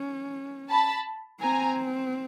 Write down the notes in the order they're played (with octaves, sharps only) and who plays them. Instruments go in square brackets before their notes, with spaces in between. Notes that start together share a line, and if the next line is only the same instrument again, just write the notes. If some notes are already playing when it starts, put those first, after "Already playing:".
Already playing: [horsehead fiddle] C#4
[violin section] A5 B5
[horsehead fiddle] C4 [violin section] G#5 A#5